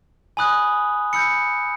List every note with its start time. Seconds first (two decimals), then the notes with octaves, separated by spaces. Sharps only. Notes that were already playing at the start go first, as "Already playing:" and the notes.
0.37 G#5 B5 D#6 F#6
1.13 B5 E6 G6 C#7